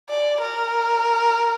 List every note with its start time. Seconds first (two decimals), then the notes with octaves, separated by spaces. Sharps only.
0.10 D5
0.41 A#4